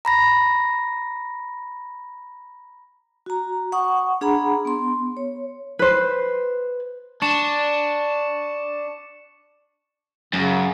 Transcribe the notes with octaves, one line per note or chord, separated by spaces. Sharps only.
A#5 B5 A#6
F#4 A#5
F#5 C#6 D#6
D4 G#4 F#5 A#5 B5
B3 C6
C#5
B4 C5
D4 C#6 C#7 E7
F#2 C#3